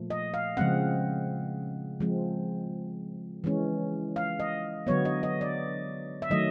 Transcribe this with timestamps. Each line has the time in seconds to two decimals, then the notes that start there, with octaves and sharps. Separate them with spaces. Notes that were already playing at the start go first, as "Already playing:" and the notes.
Already playing: A#2 F3 A3
0.10 D#5
0.34 F5
0.57 C#3 F3 G#3 C4 F#5
2.00 F3 G#3 C4
3.44 E3 G#3 C#4
4.16 F5
4.40 D#5
4.87 D3 F#3 B3 C#5
5.05 D#5
5.23 D#5
5.41 D5
6.22 E5
6.30 D#3 F#3 A3 D#5